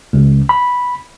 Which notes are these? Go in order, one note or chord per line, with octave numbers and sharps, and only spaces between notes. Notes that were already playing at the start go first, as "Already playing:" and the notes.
C#2
B5